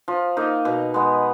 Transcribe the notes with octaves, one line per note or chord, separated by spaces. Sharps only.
F3
A#3 D#4
B2
G#3 B3